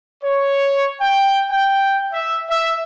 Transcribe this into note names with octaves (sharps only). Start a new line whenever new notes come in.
C#5
G5
G5
E5
E5